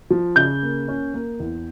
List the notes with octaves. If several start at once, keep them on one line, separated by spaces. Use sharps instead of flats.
F3
C#3 G6
A#3
C#4
A#3
E2